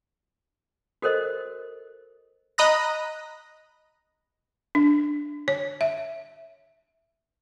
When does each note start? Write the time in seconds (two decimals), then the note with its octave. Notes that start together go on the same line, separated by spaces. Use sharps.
1.02 F#4 A4 A#4 C5 D#5
2.58 D#5 A#5 B5 D#6 F#6 A#6
4.75 D4
5.48 C#5
5.81 E5